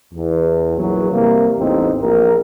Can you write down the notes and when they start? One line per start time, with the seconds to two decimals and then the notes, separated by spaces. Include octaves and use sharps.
0.14 E2
0.77 A#1 E3 F#3
1.11 C3 G3 A#3
1.59 A1 E2 C4 D#4
2.01 A#1 A#4